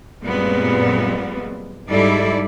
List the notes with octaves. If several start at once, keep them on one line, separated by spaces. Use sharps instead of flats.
F#2 A#2 G3 G#3 B3 C4
G#2 G3 D#4 E4 A4 D5